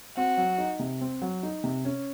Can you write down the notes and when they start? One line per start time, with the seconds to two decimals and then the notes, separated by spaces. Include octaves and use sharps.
0.16 C4 F#4
0.37 F#3
0.58 D#4
0.79 C3
1.01 C4
1.22 F#3
1.43 D#4
1.64 C3
1.85 C#4